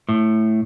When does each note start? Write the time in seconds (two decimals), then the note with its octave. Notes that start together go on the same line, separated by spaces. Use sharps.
0.09 A2